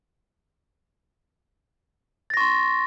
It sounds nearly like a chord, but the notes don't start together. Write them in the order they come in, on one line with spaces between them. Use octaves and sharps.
A6 A#6 C#6 C6